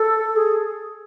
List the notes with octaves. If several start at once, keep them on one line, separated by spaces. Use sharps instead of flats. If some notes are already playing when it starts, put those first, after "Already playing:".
Already playing: A4
G#4